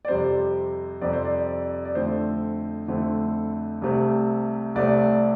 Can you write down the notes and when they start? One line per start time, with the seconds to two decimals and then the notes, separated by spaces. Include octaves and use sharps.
0.05 D5
0.08 F2 C3 G3 C4 C5
1.01 F2 C3 G3 C4 D5
1.13 C5
1.25 D5
1.85 D5
1.95 F2 D3 A3 C4 C5
2.88 F2 D3 A3 C4
3.82 C2 C3 A3 C4
4.75 C2 C3 A3 C4 D5